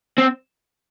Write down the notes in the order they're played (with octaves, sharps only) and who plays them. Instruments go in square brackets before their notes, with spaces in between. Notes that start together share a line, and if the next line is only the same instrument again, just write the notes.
[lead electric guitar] C4